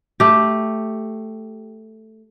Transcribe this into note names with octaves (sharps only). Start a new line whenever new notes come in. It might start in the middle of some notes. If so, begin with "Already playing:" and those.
A3 G4